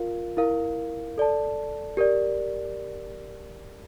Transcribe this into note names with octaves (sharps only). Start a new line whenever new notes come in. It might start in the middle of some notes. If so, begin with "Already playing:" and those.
Already playing: F4 A#4 F5
E4 A#4 F5
A4 D5 A5
G4 A#4 D5